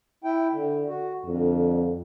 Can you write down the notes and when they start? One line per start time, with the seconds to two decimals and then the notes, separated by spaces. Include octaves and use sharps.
0.24 E4 G5
0.53 D3
0.88 F#4
1.26 F2 D3